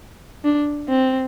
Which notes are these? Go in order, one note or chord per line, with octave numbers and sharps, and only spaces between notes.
D4
C4